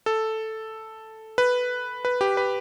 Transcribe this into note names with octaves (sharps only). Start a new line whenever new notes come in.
A4
B4
B4
G4
B4